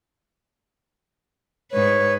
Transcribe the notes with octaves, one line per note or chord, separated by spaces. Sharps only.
G#2 B4 C#5